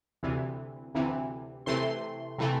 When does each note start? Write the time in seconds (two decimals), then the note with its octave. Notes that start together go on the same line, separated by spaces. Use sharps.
0.23 D2 C3 E3
0.95 D2 C3 E3
1.66 C3 E3 A3 C6
2.38 C3 E3 A3